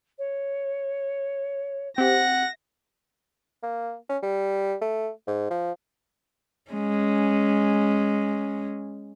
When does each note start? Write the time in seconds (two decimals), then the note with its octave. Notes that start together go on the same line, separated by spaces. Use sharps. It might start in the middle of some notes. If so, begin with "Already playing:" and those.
0.18 C#5
1.98 C4 G4 E5 F#5 A#6
3.63 A#3
4.09 C#4
4.23 G3
4.82 A3
5.27 G#2
5.50 F3
6.72 G#3 C#4